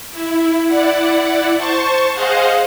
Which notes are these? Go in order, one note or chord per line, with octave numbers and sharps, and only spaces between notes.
E4
E4 D5 F#5
C5 A5 C#6
G#4 C5 D#5 F5 F#5